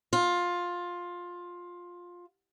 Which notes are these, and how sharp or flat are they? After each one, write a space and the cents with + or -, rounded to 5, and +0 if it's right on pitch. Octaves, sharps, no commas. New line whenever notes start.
F4 +15